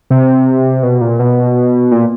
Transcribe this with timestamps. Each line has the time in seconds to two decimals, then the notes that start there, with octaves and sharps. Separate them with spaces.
0.10 C3
0.83 B2
1.01 A#2
1.19 B2
1.91 A#2